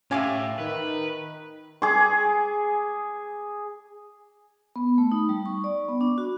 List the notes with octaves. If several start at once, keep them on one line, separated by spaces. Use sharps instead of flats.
A2 C#4 F4 G4 E5 G#5 D6
D#3 B4
G#4 D6
B3
A3
D#4
G3
C#6
D5
B3
D4
F#4